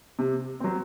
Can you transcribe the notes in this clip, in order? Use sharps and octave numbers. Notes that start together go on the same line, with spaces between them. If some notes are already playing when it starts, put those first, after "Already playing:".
C3
F#3 C4